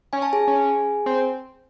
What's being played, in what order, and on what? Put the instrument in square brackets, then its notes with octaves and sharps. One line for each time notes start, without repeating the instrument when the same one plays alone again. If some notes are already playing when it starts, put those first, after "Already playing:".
[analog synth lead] C#4 [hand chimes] G#5
[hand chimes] A5
G#4 G#5
[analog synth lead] C#4
C4